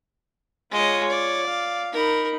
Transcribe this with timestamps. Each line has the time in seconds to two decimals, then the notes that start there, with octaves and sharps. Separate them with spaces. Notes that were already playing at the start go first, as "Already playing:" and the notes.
0.71 G#3 F4 C#5 D#5
1.10 D5
1.46 F5
1.93 D#4 A#4 B5